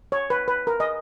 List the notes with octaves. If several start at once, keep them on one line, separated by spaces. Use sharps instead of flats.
C#5
B4
B4
A#4
D#5